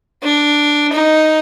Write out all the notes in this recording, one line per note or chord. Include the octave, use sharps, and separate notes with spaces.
D4
D#4